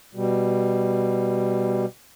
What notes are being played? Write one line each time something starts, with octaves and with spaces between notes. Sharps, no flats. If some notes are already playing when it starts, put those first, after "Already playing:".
B2 G3